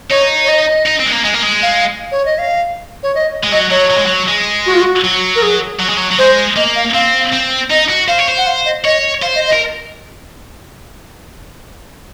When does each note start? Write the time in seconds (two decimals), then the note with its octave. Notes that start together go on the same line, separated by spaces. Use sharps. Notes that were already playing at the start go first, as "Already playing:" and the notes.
0.10 D#4 C#5
0.44 C#5
0.49 D#5
0.86 D#4
0.99 C4
1.06 G#3
1.11 A#3
1.24 G#3
1.34 A#3
1.43 G#3
1.62 F5
2.12 C#5
2.25 D#5
2.38 F5
3.03 C#5
3.15 D#5
3.44 G#3
3.52 F#3 D#5
3.71 F#3 C#5
3.91 F#3
3.98 G#3
4.06 F#3
4.28 G#3
4.66 F#4
4.73 F4
4.81 F#4
5.04 F#3
5.35 A#4
5.42 G#4
5.80 F#3
5.89 G#3
5.97 F#3
6.11 F#3
6.18 G#3 C5
6.56 A#3 D#5
6.76 F5
6.94 C4 F5
7.32 C4
7.70 D#4 D#5
7.89 F#4
8.08 C5 F5
8.19 C#5
8.29 C5
8.37 F#5
8.47 F5
8.65 D#5
8.84 C#5 D#5
9.22 C5 F5
9.35 D#5
9.48 D#5
9.53 A#4